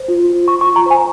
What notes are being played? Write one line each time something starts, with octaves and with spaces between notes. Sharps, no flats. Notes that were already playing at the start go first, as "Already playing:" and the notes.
Already playing: C5
F4
F4
F4 C#6
C#6
F4
A#5
C5 G#5